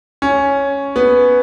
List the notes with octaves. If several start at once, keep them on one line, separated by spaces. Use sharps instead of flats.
C#4
B3